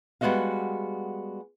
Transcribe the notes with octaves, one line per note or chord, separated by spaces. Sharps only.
G3 G#3 B3 F#4 D#5 F5